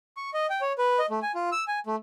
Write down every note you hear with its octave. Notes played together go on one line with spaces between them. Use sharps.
C#6
D#5
G5
C#5
B4
D#5
A3
G#5
F4
E6
G#5
A3